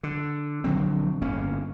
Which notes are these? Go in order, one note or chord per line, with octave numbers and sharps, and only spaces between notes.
D3
A#1 D3 F#3 C4
G1 A2 A#3 C#4